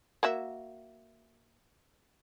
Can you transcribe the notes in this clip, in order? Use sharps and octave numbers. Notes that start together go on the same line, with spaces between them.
A#3 F#4 E5